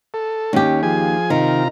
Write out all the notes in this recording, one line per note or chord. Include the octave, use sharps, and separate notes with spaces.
A4
D#2 C#4 G4
F3 G#4 G#5
C3 D#3 F4 A#5